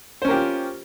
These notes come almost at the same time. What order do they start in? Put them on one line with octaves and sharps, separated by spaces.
C5 C#4 A#4 G4 F4